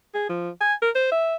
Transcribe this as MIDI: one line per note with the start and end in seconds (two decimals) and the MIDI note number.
0.14 0.28 68
0.29 0.50 53
0.61 0.74 80
0.82 0.90 70
0.95 1.09 72
1.12 1.36 76